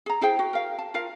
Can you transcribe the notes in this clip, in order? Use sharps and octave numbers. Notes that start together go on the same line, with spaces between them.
G#4 A#5
E4 G#4 C5 G5
F#4
A#4 F5
A5
F4 A#4 F5